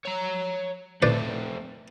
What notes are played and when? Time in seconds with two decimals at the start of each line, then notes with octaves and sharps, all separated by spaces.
0.05 C#5 A#5
1.02 A3 C4 B4 C5 D5